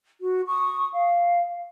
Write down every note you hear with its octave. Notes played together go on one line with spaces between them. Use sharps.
F#4
C#6 D#6
F5